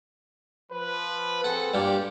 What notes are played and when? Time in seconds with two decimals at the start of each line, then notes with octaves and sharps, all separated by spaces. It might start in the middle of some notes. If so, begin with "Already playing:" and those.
0.71 F3 B4
1.44 C4 G#4 A4 F#5
1.74 G2 A#2 G4